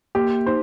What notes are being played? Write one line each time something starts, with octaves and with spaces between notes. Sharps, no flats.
A#3 G4
D#4 C5